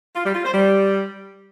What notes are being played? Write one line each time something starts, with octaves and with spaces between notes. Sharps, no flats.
F4
G3
F4
C5
G3